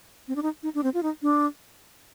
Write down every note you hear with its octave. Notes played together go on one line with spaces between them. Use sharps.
C4
D4
D#4
D#4
D4
C4
F4
D#4
D4